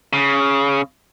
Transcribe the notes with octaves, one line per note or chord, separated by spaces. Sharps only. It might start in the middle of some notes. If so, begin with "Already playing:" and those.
C#3